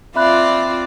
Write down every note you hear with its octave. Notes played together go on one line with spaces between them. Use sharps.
C4 F4 D5 E5 B5 F#6